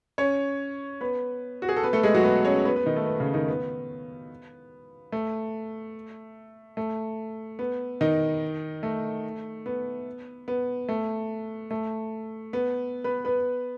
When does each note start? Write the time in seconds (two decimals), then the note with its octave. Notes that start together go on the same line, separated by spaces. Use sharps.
0.18 C#4 C#5
1.01 B3 B4
1.62 F#4
1.69 G#4
1.76 A4
1.83 B3 B4
1.93 A3 A4
2.03 G#3 G#4
2.15 F#3 F#4
2.24 B3 B4
2.45 C#4 C#5
2.65 B3 B4
2.76 B3 B4
2.86 D#3 D#4
2.96 A3
3.06 B3
3.20 C#3 C#4
3.34 D#3 D#4
3.48 B3
5.12 A3
6.77 A3
7.59 B3
8.01 D#3 D#4
8.83 A3
9.66 B3
10.48 B3
10.89 A3
11.71 A3
12.53 B3
13.04 B3 B4
13.25 B3 B4